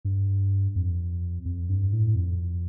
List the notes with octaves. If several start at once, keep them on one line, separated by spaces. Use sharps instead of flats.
G2
F2
F2
G2
A2
F2